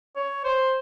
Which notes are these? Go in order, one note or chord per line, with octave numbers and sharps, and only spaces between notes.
C#5
C5